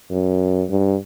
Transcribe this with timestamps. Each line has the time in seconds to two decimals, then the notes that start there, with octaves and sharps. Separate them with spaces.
0.11 F#2
0.69 G2